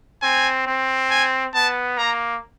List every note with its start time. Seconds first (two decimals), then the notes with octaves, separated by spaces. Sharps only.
0.23 C4 G#5
0.67 C4
1.11 G#5
1.55 B3 A5
1.98 A#3 A#5